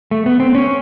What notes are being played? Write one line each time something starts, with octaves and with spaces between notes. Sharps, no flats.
A3
B3
C4
C#4